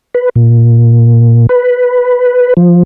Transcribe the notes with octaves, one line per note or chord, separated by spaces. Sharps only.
B4
A#2
B4
F3